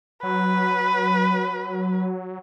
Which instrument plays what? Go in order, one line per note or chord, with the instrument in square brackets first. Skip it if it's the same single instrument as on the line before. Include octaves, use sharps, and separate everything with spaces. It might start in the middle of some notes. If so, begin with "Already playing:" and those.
[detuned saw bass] F#3 [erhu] B4